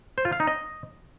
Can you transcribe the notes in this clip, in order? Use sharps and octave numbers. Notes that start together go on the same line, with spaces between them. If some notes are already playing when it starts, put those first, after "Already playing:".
C5
F4
F5
D#4
D#5